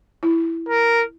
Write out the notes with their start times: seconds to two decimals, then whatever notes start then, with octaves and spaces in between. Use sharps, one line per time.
0.23 E4
0.69 A#4